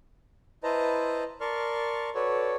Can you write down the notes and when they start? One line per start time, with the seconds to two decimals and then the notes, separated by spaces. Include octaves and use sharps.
0.63 E4 B4 C5 D#5 A5 A#5
1.41 A#4 D5 A5 C6 C#6 F6
2.15 F#4 A4 B4 C#5 D5